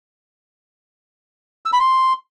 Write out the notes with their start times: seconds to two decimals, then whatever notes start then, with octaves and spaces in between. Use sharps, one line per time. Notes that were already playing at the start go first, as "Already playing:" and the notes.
1.66 E6
1.73 B5
1.80 C6